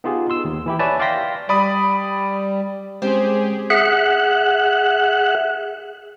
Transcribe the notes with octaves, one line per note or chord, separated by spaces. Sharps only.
B3 D#4 F4 G4 G#4
C6 E6
D#2
E3 E4 G4
B4 C#5 D5 E5 G#5 A5
D5 F5 G5 C6 A#6 B6
G3 D5 B5 D#6
G#3 C4 C#4 G4 G#4 C5
G#4 E5 F#5 F#6